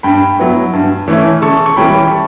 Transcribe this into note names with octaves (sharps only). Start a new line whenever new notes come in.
G2 G5 B5
F#3 B3 E4
G2
E3 A3 C#4 E4
C#3 A5 C#6
C#6
E3 G3 C#4 G5 B5
A5 C#6